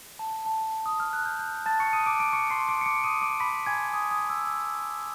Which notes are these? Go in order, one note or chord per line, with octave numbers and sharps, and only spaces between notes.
A5
A5
D#6
F6
F#6
G6
G6
A5 A6
C#6 C#7
D#6 D#7
D6 D7
D6 D7
C#6 C#7
C6 C7
D6 D7
C#7
D6 D7
D#6 D#7
D6 D7
B5 B6
G#5 G#6
D#6
D#6
E6
E6